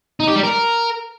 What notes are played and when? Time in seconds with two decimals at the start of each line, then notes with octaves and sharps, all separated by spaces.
0.20 D#4
0.28 G4
0.35 G3
0.43 A#4